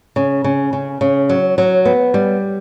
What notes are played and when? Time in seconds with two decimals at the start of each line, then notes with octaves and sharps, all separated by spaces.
0.16 C#3
0.44 C#3
0.73 C#3
1.01 C#3
1.29 F#3
1.58 F#3
1.85 B3
2.14 G3